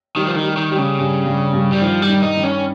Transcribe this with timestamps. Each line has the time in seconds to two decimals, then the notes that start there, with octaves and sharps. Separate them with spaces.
0.16 D#3 G3
0.27 F3
0.36 D#3
0.43 G3
0.57 D#3
0.71 G3
0.78 C#3
0.99 G2
1.26 G2
1.53 G2
1.72 G3
1.81 D#3 F3
2.02 G3
2.09 D#3
2.22 D#4
2.37 D#3
2.44 C#4